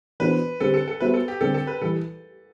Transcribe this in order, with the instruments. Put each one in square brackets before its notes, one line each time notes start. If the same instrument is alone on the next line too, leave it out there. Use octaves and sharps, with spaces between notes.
[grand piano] E3 B3 D4 F#4 C5 [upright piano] B4
[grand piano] D3 G3 C4 G4 C5 [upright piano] A4
[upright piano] A4
A4
[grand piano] G3 B3 F#4 C5 E5 [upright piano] B4
[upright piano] A4
G4
[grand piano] D3 G3 C4 G4 [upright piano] A4
[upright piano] A4
B4
[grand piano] E3 G3 [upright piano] A4